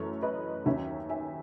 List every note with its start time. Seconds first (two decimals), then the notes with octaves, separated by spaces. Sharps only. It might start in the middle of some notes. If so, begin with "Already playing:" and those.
Already playing: F#2 E3 A3 A4 C#5
0.22 B4 D#5
0.66 D#2 D#3 F#3 C#4 C#5 E5
1.10 E5 G#5